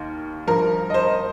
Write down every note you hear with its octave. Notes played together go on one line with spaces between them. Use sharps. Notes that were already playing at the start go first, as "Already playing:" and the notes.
Already playing: D#2 D#3
G2 F3 A#4
D#5
C5